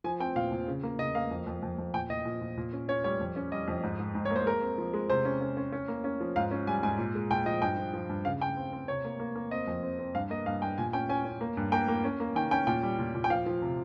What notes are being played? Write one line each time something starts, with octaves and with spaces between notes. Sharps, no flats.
F3 G#5
C4 G5
A#2 F5
A#2
C#3
A#3
C#3 D#5
A#3 F5
F2
F2
F2
F2
A#2 G5
A#2 D#5
A#2
A#2
A#2
C#4
C#4 C#5
G3 C#5
F2
C#4
G3 D#5
F2
G#2
G#2
G#2
C#5
A#3 C5
G#3 A#4
C4
F3
G#3
C3 C5
C#4
C#4
C#4
C#4
A#3
C#4
F3
G#2 F5
C#4
G3 G#5
G#2 G#5
A#2
G#3
A#2 G5
F3 D#5
G2 G5
F3
F3
G2
C#3 F5
C#3 G5
C4
C4
C3 C#5
A#3
A#3
A#3
C4 D#5
F2
C4
C4
G2 F5
A#3 D#5
G2 F5
G2 G5
A#2 G#5
C#4 G5
C#4 G#5
C#4
A#3
G2
A#3 G5
A#3
C#4
A#3
D#3 G5
C#4 G5
A#2 G5
G3
A#2
A#2
G5
F3 F5
F3
C3